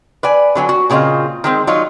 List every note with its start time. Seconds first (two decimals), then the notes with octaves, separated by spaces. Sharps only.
0.23 B4 D5 G#5
0.55 D3 F#3 G#5
0.69 F#4
0.90 A#2 C#3 C4 F4 D#5
1.44 D#3 G#3 C4
1.67 F#3 D#4 F4